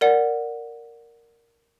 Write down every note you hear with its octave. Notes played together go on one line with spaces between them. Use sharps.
A#4 D5 F#5